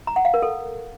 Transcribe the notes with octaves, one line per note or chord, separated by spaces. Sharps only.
A#5
F#5
F5
A#4
A4